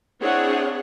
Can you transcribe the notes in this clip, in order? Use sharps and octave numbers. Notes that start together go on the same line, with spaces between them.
C4 D4 E4 G#4 C#5 F#5